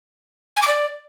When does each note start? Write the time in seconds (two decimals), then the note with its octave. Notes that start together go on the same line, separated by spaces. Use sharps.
0.57 G#5
0.62 D6
0.68 D5